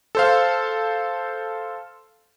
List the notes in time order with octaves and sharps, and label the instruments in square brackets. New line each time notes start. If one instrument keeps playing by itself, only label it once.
[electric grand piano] A4 C5 F5